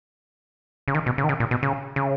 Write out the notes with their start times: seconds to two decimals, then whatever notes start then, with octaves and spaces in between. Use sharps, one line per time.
0.88 C#3
0.95 D#3
1.06 B2
1.18 C#3
1.24 D#3
1.29 C#3
1.40 A#2
1.51 B2
1.63 C#3
1.96 C#3